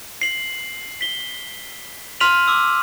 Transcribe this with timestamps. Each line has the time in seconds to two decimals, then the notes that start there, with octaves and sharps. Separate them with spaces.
0.21 C7 F#7
1.01 B6 G7
2.20 C6 F6 B6 D#7 F7 F#7
2.47 D6 E6 F7